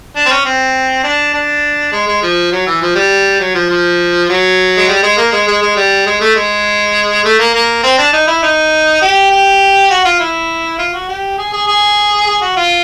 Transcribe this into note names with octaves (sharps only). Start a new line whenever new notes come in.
D4
C4
C#4
C4
D4
D4
G#3
G#3
F3
F#3
E3
F3
G3
F#3
F3
F3
F#3
G#3
G3
G#3
A#3
G#3
G#3
G#3
G3
G#3
A3
G#3
A3
A#3
A#3
C4
D4
D#4
E4
D#4
G4
G4
F#4
F4
E4
F4
F#4
G4
G#4
G#4
G#4
G#4
F#4
F4